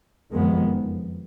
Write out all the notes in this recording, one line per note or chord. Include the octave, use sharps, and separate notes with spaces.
F#1 F2 D#3 G#3 B3